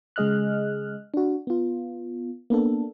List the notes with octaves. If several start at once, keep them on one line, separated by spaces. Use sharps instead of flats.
C#3 G#3 G#4 D#5 F6 F#6
D4 F#4
B3 F4
A#3 B3 D4 A4